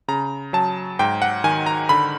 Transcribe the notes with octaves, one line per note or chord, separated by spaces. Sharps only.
C#3 A#5
F#3 A5
G#2 G5
F#5
D#3 G#5
A#5
D3 B5